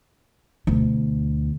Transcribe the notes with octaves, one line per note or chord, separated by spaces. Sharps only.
D2 B2